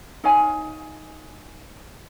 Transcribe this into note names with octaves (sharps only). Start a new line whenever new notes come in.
D#4 C#5 F5 G#5